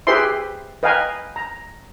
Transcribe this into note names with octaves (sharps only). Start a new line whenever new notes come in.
G4 G#4 B4 C5 E5 C6
B4 D#5 F5 G5 G#5 A#5
A#5